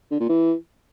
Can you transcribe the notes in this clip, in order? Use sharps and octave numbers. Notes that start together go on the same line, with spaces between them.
D3
A#2
E3